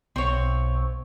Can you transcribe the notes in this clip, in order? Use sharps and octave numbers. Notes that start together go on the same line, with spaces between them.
B1 C4 C#5